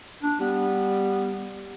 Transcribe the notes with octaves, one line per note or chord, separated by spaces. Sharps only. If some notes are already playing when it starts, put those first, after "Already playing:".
D4
G3 B3